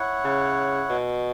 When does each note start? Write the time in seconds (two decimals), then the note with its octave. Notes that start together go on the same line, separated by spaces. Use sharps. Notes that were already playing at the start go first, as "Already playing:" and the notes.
Already playing: E4 C#5 F#5
0.25 C#3
0.90 B2